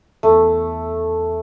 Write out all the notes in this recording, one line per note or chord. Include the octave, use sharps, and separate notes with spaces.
E2 A3